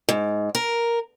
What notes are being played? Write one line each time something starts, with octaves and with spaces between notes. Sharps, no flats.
G#2
A#4